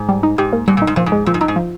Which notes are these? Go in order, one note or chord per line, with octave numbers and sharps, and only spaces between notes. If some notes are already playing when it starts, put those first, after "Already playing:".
Already playing: G#2
G3
D#4
G#2 G4
A#3
G#2 G3
A#2
D#4
G#2
A#2 F3
G#2
G#3
A#2 F3
G#2
G2 D#4
G#2
F3